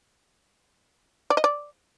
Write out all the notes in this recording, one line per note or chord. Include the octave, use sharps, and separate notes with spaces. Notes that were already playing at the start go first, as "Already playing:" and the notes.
D5
D#5
D5